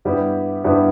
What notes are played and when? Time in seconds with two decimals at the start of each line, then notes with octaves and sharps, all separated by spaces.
0.05 G2 G3 B3 E4 G4
0.64 G2 G3 B3 E4 G4